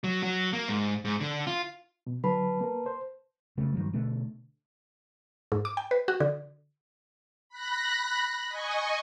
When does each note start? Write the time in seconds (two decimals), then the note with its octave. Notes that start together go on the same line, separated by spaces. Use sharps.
0.04 F#3
0.23 F#3
0.53 A#3
0.69 G#2
1.05 G#2
1.20 D3
1.47 F4
2.07 B2
2.24 D3 F#3 B4 A5 B5
2.61 A#3 A#4
2.86 C5
3.57 F#1 C#3 A3
3.73 G2 D#3 F#3
3.93 B2 D3 A3
5.52 G#2
5.65 D6
5.77 G5
5.91 B4
6.08 F#4
6.20 D3
7.49 B5 F#6 A#6
8.49 D#5 G#5 C#6